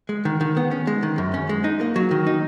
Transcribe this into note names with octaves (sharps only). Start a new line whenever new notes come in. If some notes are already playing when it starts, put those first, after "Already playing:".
G#3
D#3
D#3
B3
C#4
G#3
D#3
F#2
C#4
G#3
D#4
A#3
F#3
D#3
D#4